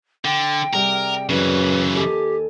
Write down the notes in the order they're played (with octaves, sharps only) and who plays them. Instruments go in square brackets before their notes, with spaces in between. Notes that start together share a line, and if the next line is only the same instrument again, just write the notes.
[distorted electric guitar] D3 [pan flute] G5
[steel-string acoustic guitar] C3 G3 G#4 [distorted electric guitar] A#4
[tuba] F#2 [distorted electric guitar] C#3 E3 [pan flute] B4
[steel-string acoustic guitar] D#2 A4 G#5 [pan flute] G4